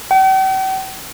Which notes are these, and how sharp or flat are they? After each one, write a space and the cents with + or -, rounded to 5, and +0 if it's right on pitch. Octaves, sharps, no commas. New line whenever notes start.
G5 -45